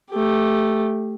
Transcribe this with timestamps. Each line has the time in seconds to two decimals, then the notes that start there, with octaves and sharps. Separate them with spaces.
0.11 A3 G4